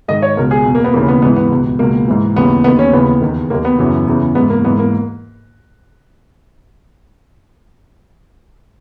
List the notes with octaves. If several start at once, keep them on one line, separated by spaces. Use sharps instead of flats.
G#2 D#3 D#5
C#5
C#2 B2 A#4
G#4
E2 B2
A#3
B3
D#2 C#3 E3 A#3
B3
G#2 E3 B3
B3
C#2 B2
C#2 B2 A#3
G#2 E3
D#2 C#3 E3 B3
D#2 D#3 B3
C#4
D#2 C#3 E3 B3
E2 D#3
D#2 D#3 A#3
B3
F#2 C#3 E3
E2 C#3 E3
G#2 E3 B3
A#3
G#2 E3 B3
A#3